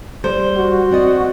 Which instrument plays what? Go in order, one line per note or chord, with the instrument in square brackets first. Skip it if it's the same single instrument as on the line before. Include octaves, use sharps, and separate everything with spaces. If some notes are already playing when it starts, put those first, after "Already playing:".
[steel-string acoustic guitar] G3 [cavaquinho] C5
[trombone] F#4
[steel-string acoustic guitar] C4 D5 D#5